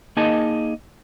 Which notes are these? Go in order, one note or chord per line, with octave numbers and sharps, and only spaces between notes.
A#3 D#4 G#4 D#5 A5